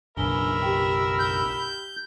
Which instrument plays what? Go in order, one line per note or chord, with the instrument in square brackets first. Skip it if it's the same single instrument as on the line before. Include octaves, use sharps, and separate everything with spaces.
[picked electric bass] F#1 B1 [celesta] D4 G#5 G7 [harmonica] A#4 E5 B5
[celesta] G4 G5
[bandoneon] G6